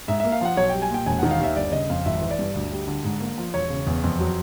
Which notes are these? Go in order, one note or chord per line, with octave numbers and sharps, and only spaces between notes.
G#2 E5
A#3 E5
F5
F3 F#5
B1 C#5
G3 G5
G#5
A#2 G5
E1 G#5
D#3 F#5
F5
D#2 E5
G1 D5
C#3 D#5
F2 F5
G#1 E5
E3
D5
G2
D2
G3
D3
G#2
A#3
F3
E1 C#5
C#3
E2
F2
F#3